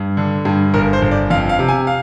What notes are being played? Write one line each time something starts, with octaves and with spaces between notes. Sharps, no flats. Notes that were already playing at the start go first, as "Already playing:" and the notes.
Already playing: G2
D3
G2
G1 A#4
C5
G1
D5
F2 F5
F5
C3
G#5
F5